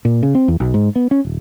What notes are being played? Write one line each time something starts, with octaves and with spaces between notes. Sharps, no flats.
A#2
C#3
C4
E2
B1
G#2
B3
C#4
D#1